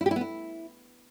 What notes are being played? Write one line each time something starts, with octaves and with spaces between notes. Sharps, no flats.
E4
G4
E4
B3
E4